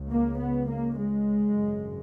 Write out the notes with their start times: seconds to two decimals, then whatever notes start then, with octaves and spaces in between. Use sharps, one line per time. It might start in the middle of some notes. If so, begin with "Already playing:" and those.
Already playing: C#2 C#3
0.11 A#3
0.39 B3
0.68 A#3
0.96 G#3
1.55 G#1 F#2 C#3